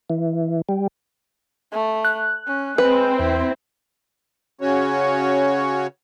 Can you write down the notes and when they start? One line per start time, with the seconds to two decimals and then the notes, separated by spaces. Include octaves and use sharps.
0.10 E3
0.69 G3
1.72 A3
2.05 F#6
2.47 C#4
2.78 G#3 C4 B4
3.20 E2 E4
4.61 C#3 C#4 F#4 C#5